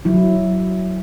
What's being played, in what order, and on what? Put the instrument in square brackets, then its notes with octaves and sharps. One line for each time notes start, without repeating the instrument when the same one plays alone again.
[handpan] F#3 E4